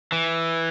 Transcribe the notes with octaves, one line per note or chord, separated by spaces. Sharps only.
E3